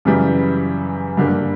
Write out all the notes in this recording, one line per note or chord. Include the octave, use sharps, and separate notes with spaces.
F#2 C#3 E3 G3
G2 D3 G3 A#3